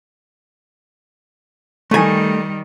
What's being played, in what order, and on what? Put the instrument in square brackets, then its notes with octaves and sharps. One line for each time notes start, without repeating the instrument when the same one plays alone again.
[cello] D#3 G3 [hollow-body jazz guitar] A3 G#5